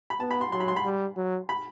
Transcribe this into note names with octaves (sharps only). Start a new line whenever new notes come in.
B5
B3 A5
B5
C6
F#3 C6
B5
C6
B5
G3
F#3
B5